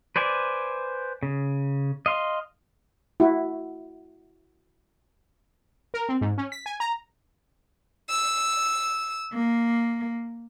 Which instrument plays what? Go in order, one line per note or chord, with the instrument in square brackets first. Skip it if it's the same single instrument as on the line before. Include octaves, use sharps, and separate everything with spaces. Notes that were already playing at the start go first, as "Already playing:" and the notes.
[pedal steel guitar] B4 C5 D5 G#5
C#3
D#5 F5 C6
[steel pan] E4 F#4
[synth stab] A#4
C4
G#2
C#4
B6
G#5
A#5
[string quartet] E6
A#3